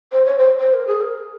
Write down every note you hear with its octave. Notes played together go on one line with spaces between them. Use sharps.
C5
C#5
C5
C5
A#4
G#4
A#4